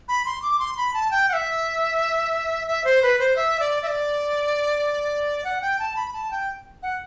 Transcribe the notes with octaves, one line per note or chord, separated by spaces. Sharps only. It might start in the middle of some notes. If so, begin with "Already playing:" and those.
B5
C6
D6
C6
B5
A5
G5
F#5
E5
E5
C5
B4
C5
E5
D5
E5
D5
F#5
G5
A5
B5
A5
G5
F#5